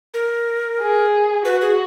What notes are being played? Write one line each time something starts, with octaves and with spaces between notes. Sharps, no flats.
A#4
G#4
F#4 B4
G#4